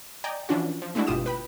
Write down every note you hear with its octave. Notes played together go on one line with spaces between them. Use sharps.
D5 D#5 G5 G#5 A#5
E3 F3 C#4 D4 F4 F#4
F3
G#3 A3 D4 E4 F#4
G1 B2 F4 G4 D#6 E7
B4 G5 B5